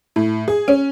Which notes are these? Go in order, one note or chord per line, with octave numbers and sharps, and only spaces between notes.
A2
G#4
C#4